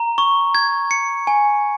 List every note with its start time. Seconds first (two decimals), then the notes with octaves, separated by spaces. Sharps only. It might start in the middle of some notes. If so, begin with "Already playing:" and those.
Already playing: A#5
0.18 C#6
0.55 G#6
0.91 C#7
1.27 G#5